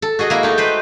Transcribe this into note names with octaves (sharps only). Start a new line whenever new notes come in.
A4
F#4 G#4 D#5
A#3 E4
A3 D#4
B4 C5 G5